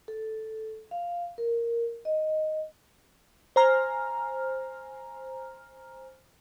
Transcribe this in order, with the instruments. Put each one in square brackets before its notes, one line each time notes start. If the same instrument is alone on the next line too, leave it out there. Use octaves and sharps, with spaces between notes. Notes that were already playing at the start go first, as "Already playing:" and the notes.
[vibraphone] A4
F5
A#4
D#5
[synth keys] C5 G#5 A#5 F6